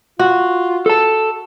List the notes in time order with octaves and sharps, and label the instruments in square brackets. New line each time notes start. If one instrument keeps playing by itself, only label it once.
[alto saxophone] F4 [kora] F#4
[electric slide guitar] A4 A5